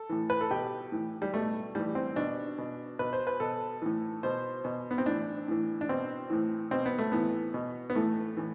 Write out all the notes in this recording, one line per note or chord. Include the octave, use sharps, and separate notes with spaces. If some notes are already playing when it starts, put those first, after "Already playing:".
Already playing: A4
A2 E3
B4
A4
B2 G4
A2 E3
G3
B2 A3
A2 E3 G3
C4
B2 D4
B2
B2 B4
C5
B4
B2 A4
A2 E3
B2 C5
B2
B3
C4
A2 E3 D4
A2 E3
D4
B2 C4
A2 E3
B2 C4
B3
A3
A2 E3 B3
B2
B3
A2 E3 A3
A2 E3